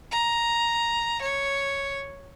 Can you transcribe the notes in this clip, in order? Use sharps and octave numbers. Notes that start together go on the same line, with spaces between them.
A#5
C#5